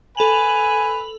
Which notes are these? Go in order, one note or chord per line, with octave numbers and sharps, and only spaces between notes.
A4 B4 G#5 F7 F#7